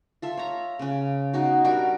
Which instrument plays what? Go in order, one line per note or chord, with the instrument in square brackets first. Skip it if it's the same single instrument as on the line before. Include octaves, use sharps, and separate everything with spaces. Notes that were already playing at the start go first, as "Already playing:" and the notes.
[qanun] F4 A4 E5
C#5 A#5
C#3 C#4
B2 D#4 F#4
G3 D4 F#4 A#4